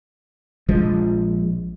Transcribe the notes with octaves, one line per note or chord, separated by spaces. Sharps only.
A#1 F3 G#3